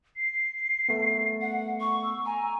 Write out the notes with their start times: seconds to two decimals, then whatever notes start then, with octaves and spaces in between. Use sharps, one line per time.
0.16 C7
0.89 A3 B3
1.41 F#5
1.80 C#6
2.04 E6
2.26 G#5 A#5